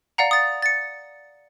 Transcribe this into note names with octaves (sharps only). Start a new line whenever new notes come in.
D5 F5 F#5 A#5
D#6 A6
A6 C#7